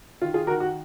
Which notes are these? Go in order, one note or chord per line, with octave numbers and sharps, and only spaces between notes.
D#3 F4
F4 G#4
D#3 F#4 A#4
F#4